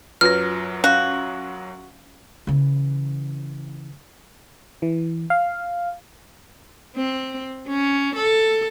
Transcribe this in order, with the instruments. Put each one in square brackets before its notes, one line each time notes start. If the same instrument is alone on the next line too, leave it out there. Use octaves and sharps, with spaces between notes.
[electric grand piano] F#2 F#3 A#6 [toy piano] F4 B4 [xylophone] F6
[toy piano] C#4 F5 [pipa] F#4
[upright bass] C#3 E3
[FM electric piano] E3
F5
[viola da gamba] C4
C#4
A4